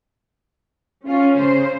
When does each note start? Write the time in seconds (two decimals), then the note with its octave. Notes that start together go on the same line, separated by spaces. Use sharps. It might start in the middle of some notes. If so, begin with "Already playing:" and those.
1.06 C#4 F4
1.35 C#3 C5